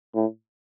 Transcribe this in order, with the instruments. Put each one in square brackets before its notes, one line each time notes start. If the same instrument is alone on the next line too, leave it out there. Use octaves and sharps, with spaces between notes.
[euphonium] A2